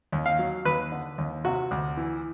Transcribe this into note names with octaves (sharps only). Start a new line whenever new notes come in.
D#2
F5
F#3
D#2 B4
D3
D#2
C3 F#4
D2
E3